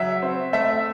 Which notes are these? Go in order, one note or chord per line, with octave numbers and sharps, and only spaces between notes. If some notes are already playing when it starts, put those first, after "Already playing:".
Already playing: C#3 F#3 E5
C4
A3 E5